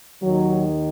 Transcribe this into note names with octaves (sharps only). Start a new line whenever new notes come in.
D#2 D#3 F#3